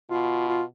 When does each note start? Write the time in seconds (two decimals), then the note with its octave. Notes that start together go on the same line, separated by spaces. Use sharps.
0.10 B2 F4
0.48 F4